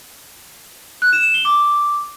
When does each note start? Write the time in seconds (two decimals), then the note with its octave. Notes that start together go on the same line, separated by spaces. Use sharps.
1.02 F#6
1.13 E7
1.23 E7
1.34 G7
1.45 D6